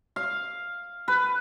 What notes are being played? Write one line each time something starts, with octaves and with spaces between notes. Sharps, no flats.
F5
B4